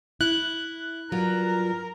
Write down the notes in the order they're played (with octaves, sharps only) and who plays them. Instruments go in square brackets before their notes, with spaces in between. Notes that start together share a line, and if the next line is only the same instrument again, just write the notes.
[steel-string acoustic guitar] E4 [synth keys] F#6
[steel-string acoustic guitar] G2 F#3 F4 [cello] A#4